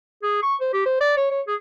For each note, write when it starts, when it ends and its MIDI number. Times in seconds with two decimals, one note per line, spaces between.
0.23 0.40 68
0.43 0.55 85
0.61 0.69 72
0.73 0.81 67
0.86 1.00 72
1.01 1.13 74
1.17 1.29 73
1.31 1.41 73
1.47 1.55 68